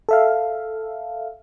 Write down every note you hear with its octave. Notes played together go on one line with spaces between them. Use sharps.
A4 E5 F5